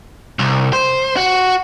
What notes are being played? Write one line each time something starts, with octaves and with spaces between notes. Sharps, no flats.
C2
C5
F#4